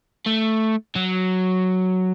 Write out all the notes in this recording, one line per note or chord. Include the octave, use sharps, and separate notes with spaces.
A3
F#3